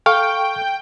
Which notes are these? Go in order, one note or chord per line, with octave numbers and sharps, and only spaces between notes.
A4 F5 G5 C#6